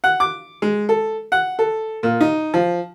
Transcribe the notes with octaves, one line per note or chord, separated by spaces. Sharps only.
F#5
D6
G#3
A4
F#5
A4
A#2
D#4
F3